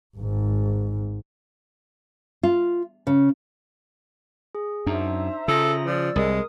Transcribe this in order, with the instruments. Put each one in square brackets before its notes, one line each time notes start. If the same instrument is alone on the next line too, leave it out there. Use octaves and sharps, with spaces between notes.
[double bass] G#1 G#2
[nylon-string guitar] F4
C#3
[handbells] G#4
[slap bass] F#2 [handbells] D4 D#4 [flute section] C5 E5 A#5
[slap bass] C#3 [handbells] F4 D#6 A#6 [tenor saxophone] A4
[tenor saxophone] F3 [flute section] D5 E6
[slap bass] C2 [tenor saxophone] G#3 [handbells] A#4 D#6